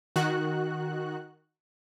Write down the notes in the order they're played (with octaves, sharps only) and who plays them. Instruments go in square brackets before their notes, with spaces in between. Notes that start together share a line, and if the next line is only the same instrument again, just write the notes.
[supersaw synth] D#3 F#4 F#6